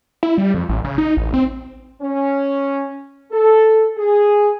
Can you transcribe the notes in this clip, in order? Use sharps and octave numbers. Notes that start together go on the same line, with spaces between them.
E4
G3
F2
A1
C#3
D#4
A1
C4
C#4
A4
G#4